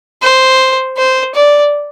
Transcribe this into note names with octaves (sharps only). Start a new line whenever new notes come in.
C5
C5
D5